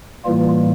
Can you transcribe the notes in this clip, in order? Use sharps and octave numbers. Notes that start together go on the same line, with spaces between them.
A2 E3 G3 A#3 F4